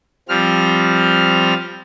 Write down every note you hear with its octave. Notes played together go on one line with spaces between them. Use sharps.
F3 G3 C4 F6